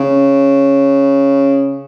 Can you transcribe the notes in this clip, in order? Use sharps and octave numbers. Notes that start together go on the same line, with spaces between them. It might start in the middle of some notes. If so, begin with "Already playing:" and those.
Already playing: C#3